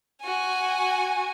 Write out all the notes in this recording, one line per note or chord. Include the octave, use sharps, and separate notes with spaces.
F#4 G#5